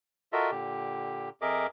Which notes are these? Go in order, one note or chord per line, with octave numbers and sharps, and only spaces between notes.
F4 F#4 A4 A#4 D#5 E5
A#2 D3 G4
F2 G#4 A#4 D#5 E5 D6